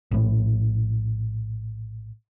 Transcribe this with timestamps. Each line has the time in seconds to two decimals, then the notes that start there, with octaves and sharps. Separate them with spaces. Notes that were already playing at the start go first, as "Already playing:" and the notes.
0.11 A#1 A2